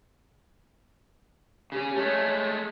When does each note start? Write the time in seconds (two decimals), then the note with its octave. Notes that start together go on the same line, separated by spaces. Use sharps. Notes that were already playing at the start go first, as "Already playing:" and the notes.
1.72 C#3 C#4 G4
1.96 G#3 A3 C#5